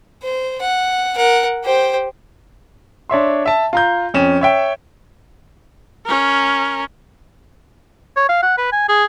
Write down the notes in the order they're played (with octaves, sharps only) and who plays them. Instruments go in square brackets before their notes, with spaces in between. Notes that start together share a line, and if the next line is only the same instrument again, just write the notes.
[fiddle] C5
F#5
A#4 F#5
G4 C5
[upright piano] D4 C#5 E5 C6
E5 A5
F4 A#5 G6
F2 C#4 E7
C#5 E5 G5
[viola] C#4 A#4
[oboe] C#5
F5
F#5
B4
G#5
G#4